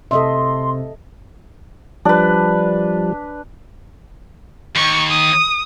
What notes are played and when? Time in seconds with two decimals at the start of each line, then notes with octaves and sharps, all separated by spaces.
0.11 C3 A4 D#5 E5 C6
2.05 F3 G3 D4 B4
4.76 D#2 C#6
5.10 D#6